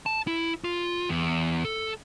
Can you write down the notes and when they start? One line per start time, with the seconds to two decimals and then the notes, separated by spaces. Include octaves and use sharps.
0.06 A5
0.27 E4
0.64 F4
1.09 E2
1.65 A4